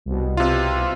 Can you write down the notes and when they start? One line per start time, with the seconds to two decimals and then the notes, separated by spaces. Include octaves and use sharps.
0.06 C2 B2
0.37 C3 F4